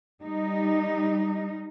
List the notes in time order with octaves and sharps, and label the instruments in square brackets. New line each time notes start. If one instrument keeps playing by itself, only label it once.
[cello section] G3 D#4